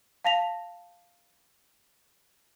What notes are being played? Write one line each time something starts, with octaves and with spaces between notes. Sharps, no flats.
F5 A5 A#6 B6 F7